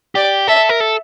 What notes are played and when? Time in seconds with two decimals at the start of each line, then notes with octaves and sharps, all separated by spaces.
0.15 G4 D5
0.47 A4 E5
0.69 A#4
0.80 A4